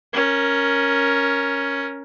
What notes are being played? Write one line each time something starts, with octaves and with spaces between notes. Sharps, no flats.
C#4 A#4